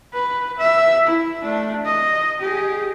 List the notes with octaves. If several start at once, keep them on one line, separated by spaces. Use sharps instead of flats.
B4
E5
E4
A3 D4
D#5
G4 G#4